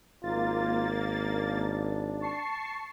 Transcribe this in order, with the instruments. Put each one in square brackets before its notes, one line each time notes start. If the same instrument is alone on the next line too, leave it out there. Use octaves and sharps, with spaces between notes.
[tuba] G#1 [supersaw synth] A#3 A6 [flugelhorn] F4
[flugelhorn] D4
[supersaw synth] A5 C#6 C7